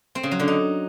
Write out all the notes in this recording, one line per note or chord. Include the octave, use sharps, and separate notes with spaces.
C4
C#3
F#3
D3
D#4